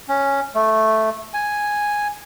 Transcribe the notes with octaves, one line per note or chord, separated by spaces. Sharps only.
C#4
A3
G#5